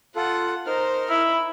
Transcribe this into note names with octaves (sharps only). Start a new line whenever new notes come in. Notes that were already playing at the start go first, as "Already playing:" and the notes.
F4 A4 F#5
D#4 A#4 C5 F6
E4 B5